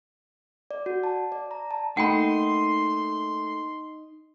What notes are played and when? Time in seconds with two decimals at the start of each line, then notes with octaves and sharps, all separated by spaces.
0.71 D5
0.86 F#4
1.03 A5
1.32 D5
1.51 A#5
1.71 A5
1.97 A3 A#3 D#4 F#5 G5 B5 C6